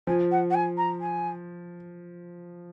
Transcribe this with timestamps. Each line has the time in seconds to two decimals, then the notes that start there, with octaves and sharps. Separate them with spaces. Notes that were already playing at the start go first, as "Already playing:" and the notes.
0.07 F3 G#5
0.31 F#5
0.51 F#5
0.55 G#5
0.77 A#5
1.01 G#5